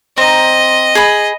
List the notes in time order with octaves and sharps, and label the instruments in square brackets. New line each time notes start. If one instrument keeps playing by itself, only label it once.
[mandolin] C4 A#5 [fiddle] D#5
[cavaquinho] G#4 B5